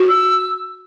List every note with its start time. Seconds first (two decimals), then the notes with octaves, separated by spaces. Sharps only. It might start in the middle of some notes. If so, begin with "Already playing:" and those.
Already playing: F#4
0.09 E6